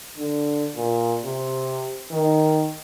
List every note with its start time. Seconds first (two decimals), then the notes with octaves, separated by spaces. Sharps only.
0.17 D3
0.76 A#2
1.25 C3
2.12 D#3